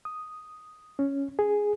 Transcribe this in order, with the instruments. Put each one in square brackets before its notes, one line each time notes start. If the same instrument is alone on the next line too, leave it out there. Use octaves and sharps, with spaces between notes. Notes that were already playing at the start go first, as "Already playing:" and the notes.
[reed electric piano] D#6
C#4
G#4